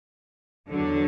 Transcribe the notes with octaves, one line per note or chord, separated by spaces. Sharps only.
E2 D3 F#3